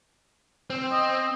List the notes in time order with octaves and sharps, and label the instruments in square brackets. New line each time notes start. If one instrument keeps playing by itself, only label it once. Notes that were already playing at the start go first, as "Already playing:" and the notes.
[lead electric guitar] C4
[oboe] D#5